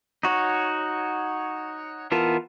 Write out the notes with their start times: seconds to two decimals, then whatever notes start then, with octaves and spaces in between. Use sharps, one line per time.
0.23 D#4 F#4 C#5
2.11 E3 B3 F4 A#4 A5